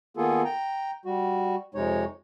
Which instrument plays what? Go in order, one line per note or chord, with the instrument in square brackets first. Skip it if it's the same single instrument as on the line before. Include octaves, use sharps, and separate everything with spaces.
[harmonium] D#3 A#3 B3 F4 G#4 A4
G5 A#5
G3 F#4
F2 C3 G#3 D#4 C#5